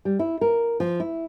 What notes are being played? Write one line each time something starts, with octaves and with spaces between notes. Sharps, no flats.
G3
E4
A#4
F3
E4